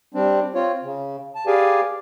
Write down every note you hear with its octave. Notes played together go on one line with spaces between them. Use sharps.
G3 C4 D4
C4 F4 C#5
C#3
A5
G4 G#4 B4 D5 F5 G#5